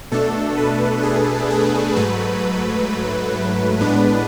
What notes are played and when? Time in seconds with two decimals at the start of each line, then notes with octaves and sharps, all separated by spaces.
0.12 B2 A3 D4 A4
0.57 B4
1.03 G#4
1.50 G#4
1.96 G#2 F#3 A3 B4
3.80 A2 G#3 B3 D4